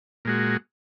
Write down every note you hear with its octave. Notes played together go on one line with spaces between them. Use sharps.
A#2 G#3 F#4